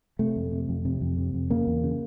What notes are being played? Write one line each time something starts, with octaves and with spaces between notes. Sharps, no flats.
C3 A3
F2
C3
F2
C3
F2
C3
F2
C#3 A#3
E2
C#3